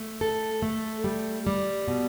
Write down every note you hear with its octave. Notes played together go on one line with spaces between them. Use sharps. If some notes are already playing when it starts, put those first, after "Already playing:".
Already playing: A3
A4
A3
G3
G3
B2